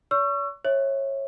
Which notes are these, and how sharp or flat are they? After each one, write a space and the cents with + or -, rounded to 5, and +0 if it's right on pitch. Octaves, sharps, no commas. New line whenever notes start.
C#5 +45 C#6 +0 E6 +40
C#5 -25 E5 -5